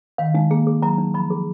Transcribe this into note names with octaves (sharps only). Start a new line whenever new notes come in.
D#3 F5
G#3 D#4
A#3 G#4
G#4
F#3 A#5
D#4
F3 B5
G#4